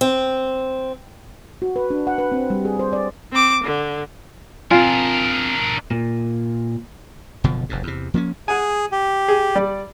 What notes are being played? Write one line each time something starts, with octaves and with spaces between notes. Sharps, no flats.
C4
F#4
B4
D4
F#5
B4
C4
G3
G#4
C5
D5
C4 D6
D3
C4 D4 F4 A#4 F5 G#5
A#2
F#1 B2 D3 F3
F1 F2 G#2
E2 C3
F3 A#3 B3 C#4
G#4 F#5 G#5
G4
G#4
G3 D5